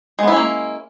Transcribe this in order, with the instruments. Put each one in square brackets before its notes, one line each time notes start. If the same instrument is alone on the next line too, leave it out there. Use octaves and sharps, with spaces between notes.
[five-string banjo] G#3
B3
E4
C#4
A#3